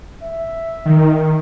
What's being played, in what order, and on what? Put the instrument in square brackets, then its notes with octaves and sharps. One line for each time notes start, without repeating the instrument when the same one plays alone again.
[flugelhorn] E5
[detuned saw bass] D#3